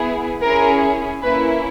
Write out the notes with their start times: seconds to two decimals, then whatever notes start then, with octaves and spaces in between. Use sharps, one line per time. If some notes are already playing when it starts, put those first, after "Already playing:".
Already playing: B3 E4 G#4
0.43 C#4 E4 G#4 A#4
1.22 A#3 C#4 E4 B4